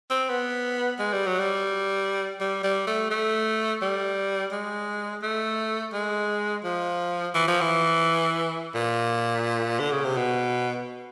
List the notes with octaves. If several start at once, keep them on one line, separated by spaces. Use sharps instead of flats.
C4
B3
G#3
G3
F#3
G3
G3
G3
A3
A3
G3
G#3
A3
G#3
F3
E3
F3
E3
A#2
D3
C#3
C3
B2